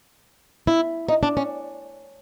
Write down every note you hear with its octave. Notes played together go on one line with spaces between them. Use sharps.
E4
D#4
D4
C#4